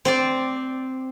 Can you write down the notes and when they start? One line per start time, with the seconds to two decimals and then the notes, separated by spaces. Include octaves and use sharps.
0.05 C4 C5 D5